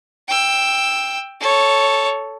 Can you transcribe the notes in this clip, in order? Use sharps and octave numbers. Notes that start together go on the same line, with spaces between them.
G5 E6
A4 C#5